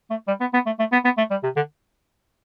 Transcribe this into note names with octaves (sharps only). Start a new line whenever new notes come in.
A3
G3
B3
B3
A3
A3
B3
B3
A3
G3
C3
D3